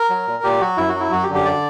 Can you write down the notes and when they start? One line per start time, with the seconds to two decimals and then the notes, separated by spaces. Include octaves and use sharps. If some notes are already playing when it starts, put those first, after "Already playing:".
Already playing: A#4
0.10 F#3
0.27 A#2
0.44 A#2 G4
0.60 F#3 F#4
0.77 F#2 E4
0.89 F#4
0.95 F#3
1.00 E4
1.12 F#2 F#4
1.23 G4
1.29 D3
1.35 G4
1.45 D5